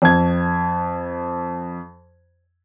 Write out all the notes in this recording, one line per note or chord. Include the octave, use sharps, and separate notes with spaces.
F2 G#6